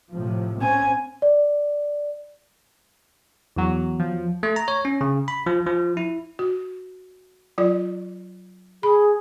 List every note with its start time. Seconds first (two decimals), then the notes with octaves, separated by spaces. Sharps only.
0.11 A2 C3 F3
0.62 C4 C#4 G#5
1.22 D5
3.56 E2 F#3
4.00 F3
4.43 A3
4.56 A#5
4.68 C#5
4.85 C#4
5.01 C#3
5.28 B5
5.46 F3
5.66 F3
5.97 E4
6.39 F#4
7.58 F#3 F4 D5
8.83 G#4 B5